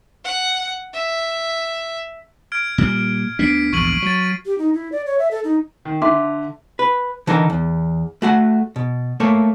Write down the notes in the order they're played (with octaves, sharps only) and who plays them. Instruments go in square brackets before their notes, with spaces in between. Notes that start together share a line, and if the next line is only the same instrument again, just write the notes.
[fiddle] F#5
E5
[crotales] F6 G#6 D7
[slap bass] A#2 G3
[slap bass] D2 B3 D4 [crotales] B6 C7 D7
[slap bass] A#1 E2 G#2 [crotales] C#6 D#7 F#7
[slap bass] F#3 [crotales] A6 D#7
[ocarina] G4
D#4
E4
D5
C#5
E5
A4
D#4
[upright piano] D#3
[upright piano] D3 [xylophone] E5 C6 D6
[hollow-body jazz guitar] B4
D3 E3 D#4 A4 A#4
E2
A3 F#4 F#5
B2
A3 A#3 A4 C#5